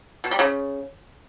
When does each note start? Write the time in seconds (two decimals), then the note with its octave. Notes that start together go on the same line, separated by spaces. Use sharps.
0.24 B2
0.31 G3
0.39 C#3